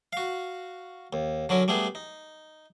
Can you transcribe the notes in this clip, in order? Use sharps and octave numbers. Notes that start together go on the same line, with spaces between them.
F#4 F5
D#2
D3 F#3 C#4 A#4
G3 A3 B3 G#4
D#4